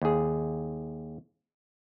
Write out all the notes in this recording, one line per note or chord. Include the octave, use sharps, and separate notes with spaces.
D#2 G#4